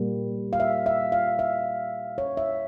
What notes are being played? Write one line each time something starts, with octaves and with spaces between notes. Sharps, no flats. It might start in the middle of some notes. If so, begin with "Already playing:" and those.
Already playing: A#2 G3 A#3
F5
E5
E5
F5
E5
C#5
E5